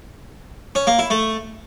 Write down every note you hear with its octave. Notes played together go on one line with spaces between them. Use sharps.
C#4
A#3
E4
A3